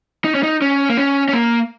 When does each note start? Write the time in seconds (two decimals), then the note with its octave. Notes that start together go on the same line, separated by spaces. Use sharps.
0.24 D#4
0.35 C#4
0.43 D#4
0.62 C#4
0.89 A#3
0.97 C#4
1.29 C#4
1.33 A#3